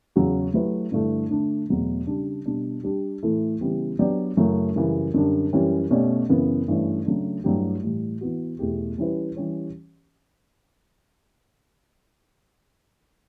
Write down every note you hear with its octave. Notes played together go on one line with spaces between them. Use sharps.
E2 C#3 F#3 C#4 F#4
F#3 A3 E4 G4 B4
G2 D3 A3 E4 A4
D3 A3 D4
E2 B2 F#3 A3
C#3 G3 D4
B2 G3 D4
G3 D4 G4
A2 E3 A3 E4 A4
C#3 E3 G3 B3
F#3 B3 D4 G4 D5
F#2 C#3 F#3 A3 E4
F#2 C#3 E3 G3
F#2 D3 G3 D4
F#2 E3 G3 C#4
B2 A3 C#4 G4 D5
F#2 C#3 E3 B3
G2 E3 A3 C#4
C#3 F#3 A3 D4
G2 F#3 A3 E4 G4
A2 E3 G3
E3 B3 F#4
E2 B2 A3 E4 G4
E3 G3 C#4 E4 B4
E3 G3 C#4 G4 C#5